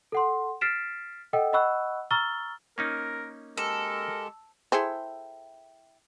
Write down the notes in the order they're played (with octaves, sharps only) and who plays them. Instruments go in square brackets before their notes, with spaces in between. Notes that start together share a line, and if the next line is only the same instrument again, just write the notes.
[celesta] A4 F#5 C6
F6 A6 B6 C7 D7 E7
A4 D#5 F#5 G5 E6
D#5 F#5 B5 C#6 E6 F#6
A#5 C#6 E6 F6 A6 G7
[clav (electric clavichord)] A#3 C#4 D#4 [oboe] A#4
[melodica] G#3 G4 [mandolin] A4 [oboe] A#4
[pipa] E4 A4 G5 [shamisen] G#4 C5